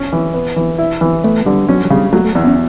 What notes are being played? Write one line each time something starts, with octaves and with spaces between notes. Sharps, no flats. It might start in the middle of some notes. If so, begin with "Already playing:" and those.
Already playing: C#4
E3
B3
E3
E4
E3
A3 B3
D3 G3
F#3 C#4
F#3
C#3 G3
F#3 A3
A3
E2 B3
C#4